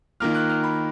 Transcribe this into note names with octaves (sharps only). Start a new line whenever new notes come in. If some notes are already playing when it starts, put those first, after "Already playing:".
D#3 A#3 F4 F6
F#6
F6
B5